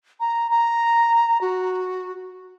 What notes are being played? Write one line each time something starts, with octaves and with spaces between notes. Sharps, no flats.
A#5
A#5
F#4